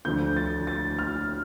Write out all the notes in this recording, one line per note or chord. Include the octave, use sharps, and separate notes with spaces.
D2 D3 F3 G6
A6
A6
F6